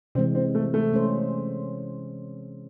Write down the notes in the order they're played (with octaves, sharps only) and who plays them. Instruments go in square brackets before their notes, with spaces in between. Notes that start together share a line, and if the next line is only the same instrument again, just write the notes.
[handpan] C3 E3 G#3 [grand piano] C4
[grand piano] C4
A3
A3
[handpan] G#3 C#4 G#4 C5